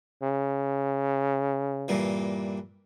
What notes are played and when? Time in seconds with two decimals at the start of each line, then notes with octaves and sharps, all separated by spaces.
0.23 C#3
1.88 G2 A#2 E3